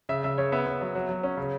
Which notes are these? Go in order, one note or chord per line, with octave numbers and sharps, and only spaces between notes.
C#3 E5
C#3 E5
C#3 C#5
B3 E5
B3
F#3
F#3
F#3
C#4
C#3